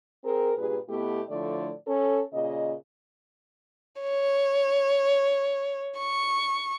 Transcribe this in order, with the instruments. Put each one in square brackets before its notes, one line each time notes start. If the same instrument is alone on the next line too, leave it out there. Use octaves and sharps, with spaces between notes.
[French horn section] C4 G#4 A#4
G2 A#2 G4 G#4 B4
B2 A3 B3 E4 G4
A2 D3 F3 A3 D5
C#4 A4
A#2 C#3 D#5
[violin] C#5
C#6